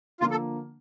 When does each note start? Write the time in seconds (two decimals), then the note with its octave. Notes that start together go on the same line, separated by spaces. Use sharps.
0.20 D3 F3 A#3 D4 F4
0.31 A4